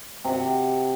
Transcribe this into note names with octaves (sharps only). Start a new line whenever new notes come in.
C3 F#5